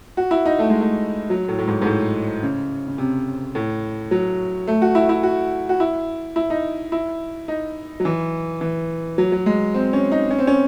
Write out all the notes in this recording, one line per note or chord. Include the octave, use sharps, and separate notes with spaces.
F#4
E4
D#4
A3
G#3
A3
F#3
A2
A2
G#2
G#2
A2
C#3
C#3
C3
A2
F#3
A3
F#4
E4
E4
F#4
F#4
E4
E4
D#4
E4
D#4
F#3
E3
E3
F#3
F#3
G#3
C4
C#4
D#4
C#4
C4
C#4